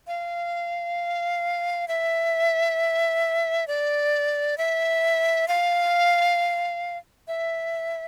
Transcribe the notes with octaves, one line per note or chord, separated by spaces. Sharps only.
F5
E5
D5
E5
F5
E5